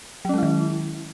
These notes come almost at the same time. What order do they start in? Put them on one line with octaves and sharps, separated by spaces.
F#3 C#4 G#3 E4 D#3